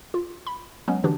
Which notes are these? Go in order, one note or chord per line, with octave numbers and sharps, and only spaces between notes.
F4
B5
F#3 G#3 B3 C#4
D3 E3 D4 F#4 G4